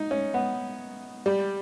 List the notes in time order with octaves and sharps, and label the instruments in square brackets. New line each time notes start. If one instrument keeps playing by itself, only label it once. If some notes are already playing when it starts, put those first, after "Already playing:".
Already playing: [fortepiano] D#4
C#4
B3
G3